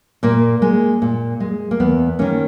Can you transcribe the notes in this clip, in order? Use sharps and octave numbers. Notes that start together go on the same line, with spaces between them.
A#2 A#3
G#3
A#2
G#3
A#3
E2 B3
D#3 A#3 C#4